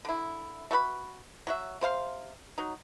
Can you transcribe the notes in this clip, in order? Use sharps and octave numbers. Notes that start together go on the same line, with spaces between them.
D3 E4
A3 F#4 B4 B5
F#3 F#4 E5
C3 C5 F5 C6
F#3 D#4